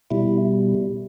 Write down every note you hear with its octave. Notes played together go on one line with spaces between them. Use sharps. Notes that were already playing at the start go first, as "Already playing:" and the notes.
B2 G3 E4